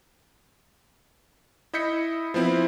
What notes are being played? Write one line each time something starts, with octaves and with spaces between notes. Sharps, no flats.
E4 D#5 E5 G6 B6 C#7
F3 B3 C4 E4